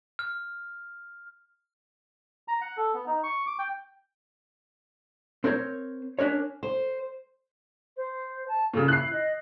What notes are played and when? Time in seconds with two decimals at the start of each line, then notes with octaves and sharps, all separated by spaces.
0.19 F6
2.48 A#5
2.61 F#5
2.77 A4
2.94 B3
3.07 D#4
3.23 C#6
3.47 D6
3.59 G5
5.44 C4 A#4 C5 C#5
6.19 C#4 D4 A#4 C#5
6.63 C5
7.97 C5
8.48 A5
8.74 A#2 C#3 A4
8.88 E4 F#6 C7
9.13 D#5